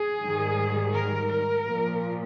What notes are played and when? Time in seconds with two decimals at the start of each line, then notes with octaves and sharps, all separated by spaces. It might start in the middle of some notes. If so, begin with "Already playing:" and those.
Already playing: G#4
0.22 G#2 D#3 G3
0.94 A#4
1.31 A#4
1.65 A#2 F3